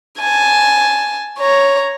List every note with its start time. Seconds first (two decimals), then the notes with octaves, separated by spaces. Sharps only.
0.19 G#5 A5
1.39 C#5 A#5